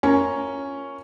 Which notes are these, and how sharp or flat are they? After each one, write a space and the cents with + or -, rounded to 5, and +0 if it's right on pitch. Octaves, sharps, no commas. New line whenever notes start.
C#4 +0 F4 +0 A#4 +0